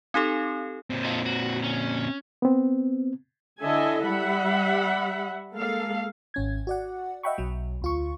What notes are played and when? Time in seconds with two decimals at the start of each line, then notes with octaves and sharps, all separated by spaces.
0.14 C4 D#4 G4 A4
0.90 A#2 C4
1.05 F4 A4 D#5
1.26 F#4
1.64 C#4
2.42 B3 C4
3.61 D3 E4 A4 D#5 E5 G#5
4.06 G3 E5 F#5 B5
5.54 G#3 A#3 A4 F5
6.34 G#1 C#4 G#6
6.67 F#4 D5 F#5
7.23 D#5 E5 F#5 G5 B5 C#6
7.38 B1 F#3
7.82 D2 F4 C#6